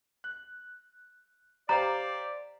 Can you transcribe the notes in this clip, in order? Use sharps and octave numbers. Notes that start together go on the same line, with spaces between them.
F#6
G4 C5 D5 F5 A#5